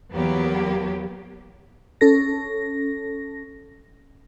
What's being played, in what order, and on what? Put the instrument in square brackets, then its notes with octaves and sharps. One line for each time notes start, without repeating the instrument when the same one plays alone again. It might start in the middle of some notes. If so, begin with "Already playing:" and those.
[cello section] E2 F#3 A#3 B3 G4
[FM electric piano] C#4 A4 A#6